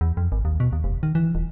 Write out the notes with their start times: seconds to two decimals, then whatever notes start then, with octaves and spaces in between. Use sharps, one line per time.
0.01 E2
0.17 F2
0.32 G#1
0.45 D#2
0.60 B2
0.73 D#2
0.84 F1
1.03 D#3
1.15 E3
1.35 D#1